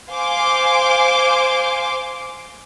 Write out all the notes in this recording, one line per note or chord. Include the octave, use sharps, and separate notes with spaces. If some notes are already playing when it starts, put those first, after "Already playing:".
C5 F5 G#5 C6 D6